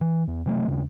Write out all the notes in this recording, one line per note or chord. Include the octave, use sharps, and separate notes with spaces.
E3
E2
C3 F#3 G3 A3
D#2 C#3